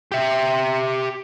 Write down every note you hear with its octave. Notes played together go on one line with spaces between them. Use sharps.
G4 E5